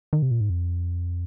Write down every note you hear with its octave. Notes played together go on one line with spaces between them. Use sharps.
D#3
C3
A#2
G#2
F2